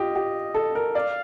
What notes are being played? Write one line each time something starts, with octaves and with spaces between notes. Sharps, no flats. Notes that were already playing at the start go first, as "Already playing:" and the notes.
Already playing: F4 G4 D#5
G4
A4
A#4
D5 F5